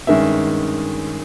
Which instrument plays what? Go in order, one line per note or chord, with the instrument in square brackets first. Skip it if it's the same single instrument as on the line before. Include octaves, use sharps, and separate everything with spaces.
[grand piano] G2 D#3 G#3 C#4 E5